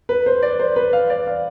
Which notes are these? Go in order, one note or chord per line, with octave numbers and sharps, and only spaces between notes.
B4
C5
D5
C5
B4
F5
D5
F5